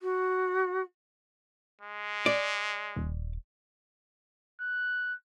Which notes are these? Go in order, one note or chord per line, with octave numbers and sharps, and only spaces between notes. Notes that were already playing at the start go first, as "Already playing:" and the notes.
F#4
G#3
D5
D#1
F#6